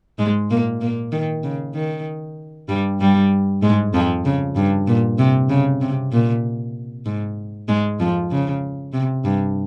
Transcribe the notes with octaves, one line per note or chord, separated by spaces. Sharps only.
G#2 G#3
A#2 A#3
A#2 A#3
D#3
C#3
D#3
G2 G3
G2 G3
G#2 G#3
F2 F3
C#3
G2
A#2
C3
C#3
C3
A#2
G#2
G#2 G#3
F2 F3
C#3
C3
G2